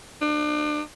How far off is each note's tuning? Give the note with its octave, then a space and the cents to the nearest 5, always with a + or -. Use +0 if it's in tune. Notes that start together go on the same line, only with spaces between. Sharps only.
D4 +35